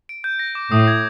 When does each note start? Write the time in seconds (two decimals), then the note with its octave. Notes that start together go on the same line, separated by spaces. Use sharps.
0.09 D7
0.24 G6
0.39 A#6
0.55 D6
0.71 A2 D#6
0.88 G#6